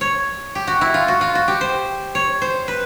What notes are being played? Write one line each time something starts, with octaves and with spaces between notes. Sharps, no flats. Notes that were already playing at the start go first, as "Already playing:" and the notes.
C#5
G4
F#4
E4
F4
F#4
F4
F#4
G4
C5
C#5
C5
B4